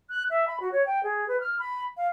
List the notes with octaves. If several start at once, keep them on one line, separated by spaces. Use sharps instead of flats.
F#6
E5
B5
F#4
C#5
G5
G#4
B4
F6
B5
F5